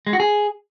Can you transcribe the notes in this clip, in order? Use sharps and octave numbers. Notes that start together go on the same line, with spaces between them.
G#3
F#4
G#4